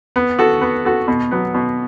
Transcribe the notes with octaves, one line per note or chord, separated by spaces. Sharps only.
B3
F#4 A4
B3
F#4 A4
B2
F#3 B3
B2